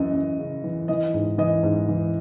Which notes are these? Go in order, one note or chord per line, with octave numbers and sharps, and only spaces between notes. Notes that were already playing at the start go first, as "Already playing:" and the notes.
Already playing: F#2 E3 D#5
F#2
C#3
E3
E3 D#5
G#2
E3 D#5
G#2
E3